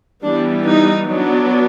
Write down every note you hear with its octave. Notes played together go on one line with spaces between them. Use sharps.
E3 G3 B3 D4
D#4
F#3 B3 D4